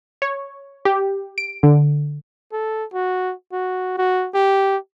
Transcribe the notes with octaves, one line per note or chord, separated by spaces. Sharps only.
C#5
G4
D7
D3
A4
F#4
F#4
F#4
G4